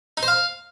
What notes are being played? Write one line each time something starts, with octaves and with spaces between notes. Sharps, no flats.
D#4
C5
F5